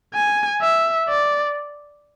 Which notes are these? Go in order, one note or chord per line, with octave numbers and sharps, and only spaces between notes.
G#5
E5
D5